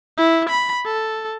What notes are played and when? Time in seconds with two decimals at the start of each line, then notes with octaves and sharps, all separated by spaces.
0.17 E4
0.49 B5
0.85 A4